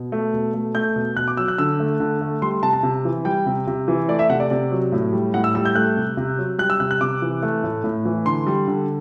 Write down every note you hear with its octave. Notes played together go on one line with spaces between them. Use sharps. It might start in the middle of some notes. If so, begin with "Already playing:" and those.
Already playing: B2
A3
B2
A3
A3 G6
B2
B2 F#6
D6
F#3 E6
F#6
D3 E6
A3
D3
A3
G3 C6
C3 A5
A5
C3
E3
G3 G5
C3
C3
E3
A3 D5
E5
C3 F#5
D5
C3 D5
F#3
A2
G3
A2 F#5
E6
G3 E6
G6
A3 F#6
C3
C3
F#3
G3 F#6
E6
C3 F#6
F#6
C3 D6
E3
A3
A2
A2
E3
D3 C6
G3
D3